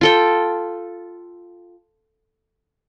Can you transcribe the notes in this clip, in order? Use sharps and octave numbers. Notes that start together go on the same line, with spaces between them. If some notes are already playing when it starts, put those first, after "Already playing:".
F4 A4 G5